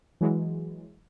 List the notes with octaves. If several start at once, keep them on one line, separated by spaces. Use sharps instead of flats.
E3 F#3 G#3